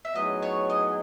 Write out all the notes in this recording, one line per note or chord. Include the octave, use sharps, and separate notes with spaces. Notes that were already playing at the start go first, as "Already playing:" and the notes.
E5
A2 F#3 B3 D#4 G#4 D#5
C#5
D#5